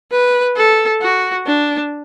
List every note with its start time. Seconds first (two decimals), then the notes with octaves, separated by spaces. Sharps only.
0.11 B4
0.56 A4
1.02 F#4
1.47 D4